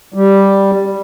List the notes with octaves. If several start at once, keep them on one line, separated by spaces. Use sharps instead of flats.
G3